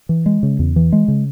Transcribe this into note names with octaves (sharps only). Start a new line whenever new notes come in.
E3
G#3
C#3
E2
E3
G#3
C#3